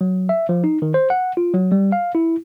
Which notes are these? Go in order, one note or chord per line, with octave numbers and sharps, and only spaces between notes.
F#3
E5
F3
D#4
D#3
C5
F#5
F4
F#3
G3
F5
E4